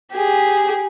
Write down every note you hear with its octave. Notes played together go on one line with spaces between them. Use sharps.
G4 G#4